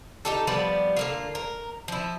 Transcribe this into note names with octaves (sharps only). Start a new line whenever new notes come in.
D#4 G4 A4
F3 G3 B3 D5
D3 A#3 F4
A#4
F3 E4